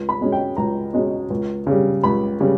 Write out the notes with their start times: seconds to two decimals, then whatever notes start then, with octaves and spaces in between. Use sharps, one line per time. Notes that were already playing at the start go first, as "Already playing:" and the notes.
Already playing: C#2
0.09 B5
0.21 B2 G#3 C#4
0.32 G5
0.57 C#2 A#5
0.94 B2 G#3 C#4
1.30 C#2
1.67 C#3 G3
2.03 C#2 B5
2.40 C#3 G3